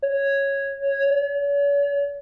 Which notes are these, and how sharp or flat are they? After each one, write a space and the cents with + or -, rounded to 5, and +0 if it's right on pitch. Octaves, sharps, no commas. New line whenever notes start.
C#5 -5
C#5 +45